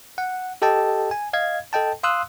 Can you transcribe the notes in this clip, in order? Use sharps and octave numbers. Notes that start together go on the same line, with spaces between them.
F#5
G4 A4 D#5 G5 A5
G#5
D#5 F5 G#6
A4 D#5 G5 A5
F5 C6 D#6 E6 F#6